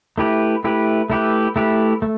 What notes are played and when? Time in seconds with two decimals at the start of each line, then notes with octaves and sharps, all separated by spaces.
0.18 A3 E4 G4 B4
0.64 A3 E4 G4 B4
1.10 A3 E4 G4 B4
1.56 A3 E4 G4 B4
2.02 A3